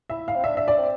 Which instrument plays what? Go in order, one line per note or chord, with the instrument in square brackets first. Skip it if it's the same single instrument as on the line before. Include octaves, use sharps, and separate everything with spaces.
[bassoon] E4 [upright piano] E5
[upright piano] F5
[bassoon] C4
[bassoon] D4 [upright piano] E5
[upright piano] E5
D5
[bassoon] C4